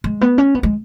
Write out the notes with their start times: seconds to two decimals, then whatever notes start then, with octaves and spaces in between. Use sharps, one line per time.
0.04 G#3
0.21 B3
0.38 C#4
0.55 B3
0.63 G#3